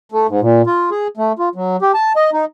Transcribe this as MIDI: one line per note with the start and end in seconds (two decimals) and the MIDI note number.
0.12 0.27 57
0.29 0.40 44
0.41 0.62 46
0.67 0.90 65
0.91 1.07 68
1.17 1.32 57
1.39 1.49 65
1.55 1.77 54
1.82 1.92 67
1.94 2.13 81
2.16 2.30 75
2.33 2.45 63